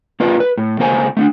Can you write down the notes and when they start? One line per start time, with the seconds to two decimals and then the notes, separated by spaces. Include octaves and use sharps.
0.20 A#3 F4 B4 D5
0.40 B4
0.58 A2
0.79 C#2 A#3 C5 G#5
1.17 A3 C#4 D4